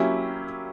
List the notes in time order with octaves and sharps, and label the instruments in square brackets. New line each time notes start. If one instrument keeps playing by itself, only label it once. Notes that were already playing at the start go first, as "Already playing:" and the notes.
Already playing: [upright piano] F#3 A#3 C#4 E4 G4